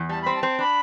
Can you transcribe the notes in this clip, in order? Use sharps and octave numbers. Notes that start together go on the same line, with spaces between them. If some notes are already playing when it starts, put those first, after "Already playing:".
Already playing: E2
G3 A5
C4 B5
A5
C4
D4 B5